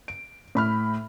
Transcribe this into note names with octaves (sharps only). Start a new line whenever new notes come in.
D7
A2 B5 F6